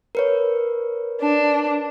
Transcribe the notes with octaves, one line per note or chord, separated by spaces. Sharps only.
A#4 B4 C#5
D4